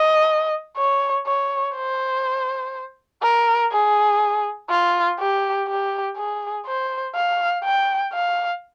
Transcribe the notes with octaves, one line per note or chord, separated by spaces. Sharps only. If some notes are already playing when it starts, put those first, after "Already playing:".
Already playing: D#5
C#5
C#5
C5
A#4
G#4
F4
G4
G4
G#4
C5
F5
G5
F5